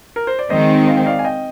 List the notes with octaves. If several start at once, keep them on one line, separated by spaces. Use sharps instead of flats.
A#4
C5
D5
D#3 G#3 C4 C5 D#5
F5
G5
D5 F5
G#5
D#5 G5